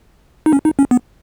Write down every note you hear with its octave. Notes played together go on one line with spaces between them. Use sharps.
D#4
C#4
D#4
C#4
B3